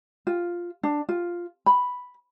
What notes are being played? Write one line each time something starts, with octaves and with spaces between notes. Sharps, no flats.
F4
D4
F4
B5